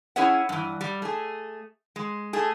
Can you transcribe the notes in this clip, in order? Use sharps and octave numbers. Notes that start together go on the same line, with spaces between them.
C#4 E4 G#4 C#5 E5 F#5
G2 E3
G3
A3 G#4
G#3
A3 G#4